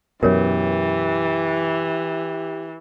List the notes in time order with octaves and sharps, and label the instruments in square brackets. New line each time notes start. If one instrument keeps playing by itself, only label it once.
[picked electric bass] F#2 B2 [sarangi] E3 [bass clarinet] G4 [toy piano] A#4 C#5